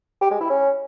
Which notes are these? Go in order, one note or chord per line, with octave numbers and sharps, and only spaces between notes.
G4
G#3
E4
C#4